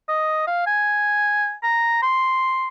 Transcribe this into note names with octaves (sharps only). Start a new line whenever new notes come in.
D#5
F5
G#5
A#5
C6